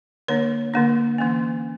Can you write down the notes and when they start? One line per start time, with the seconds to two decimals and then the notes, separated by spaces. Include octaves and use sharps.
0.28 D3 A#3 D4 C#5
0.74 D3 A#3 D4
1.18 E3 A#3 C#4